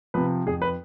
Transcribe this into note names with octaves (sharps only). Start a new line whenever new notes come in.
C3 F3 B4
F2 G#4
B4